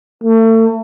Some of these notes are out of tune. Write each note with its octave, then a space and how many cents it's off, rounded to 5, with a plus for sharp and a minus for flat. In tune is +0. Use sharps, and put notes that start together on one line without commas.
A3 +35